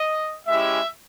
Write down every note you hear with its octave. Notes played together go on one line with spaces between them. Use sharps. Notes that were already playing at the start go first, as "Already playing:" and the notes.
Already playing: D#5
G#3 C#4 E4 G4 E5